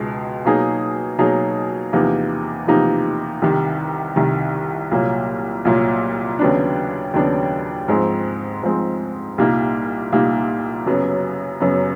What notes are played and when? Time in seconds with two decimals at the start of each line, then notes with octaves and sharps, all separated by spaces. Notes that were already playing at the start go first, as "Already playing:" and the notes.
Already playing: C#2 B2 G#3
0.45 B2 F#3 A#3 D#4 G#4
1.18 B2 F#3 A#3 D#4 G#4
1.93 E2 C3 F3 A#3 D#4
2.67 E2 C3 F3 A#3 D#4
3.42 C2 C3 D#3
4.16 C2 C3 D#3
4.91 C2 A#2 F#3 A#3
5.65 C2 A#2 F#3 A#3
6.39 D#2 C#3 F#3 B3 D4
7.14 D#2 C#3 F#3 B3 D4
7.88 G#2 F3 G#3 C4
8.63 G#2 F3 G#3 C4
9.38 C2 A#2 G3 A#3 D#4
10.12 C2 A#2 G3 A#3 D#4
10.86 F#2 C#3 F#3 B3
11.60 F#2 C#3 F#3 B3